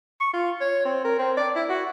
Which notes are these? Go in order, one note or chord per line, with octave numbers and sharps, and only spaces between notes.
C#6
F4
C#5
C4
A#4
C4
D5
E4
F#4